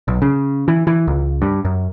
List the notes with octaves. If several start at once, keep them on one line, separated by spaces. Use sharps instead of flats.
B1
C#3
E3
E3
C#2
G2
F#2